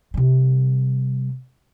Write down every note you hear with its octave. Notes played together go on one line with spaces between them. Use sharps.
C3 G3